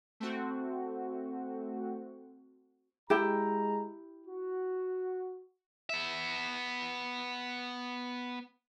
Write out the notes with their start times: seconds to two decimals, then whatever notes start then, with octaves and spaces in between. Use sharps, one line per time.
0.20 A3 C4 F#4
3.10 G#3 E4 G4 A#5
4.27 F#4
5.90 B3 E5